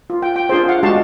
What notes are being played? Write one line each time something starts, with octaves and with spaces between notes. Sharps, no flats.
F4
G5
G5
D4 F4 G#4 C5
F5 F#5
G#3 D4 F#4 G4 F5 A5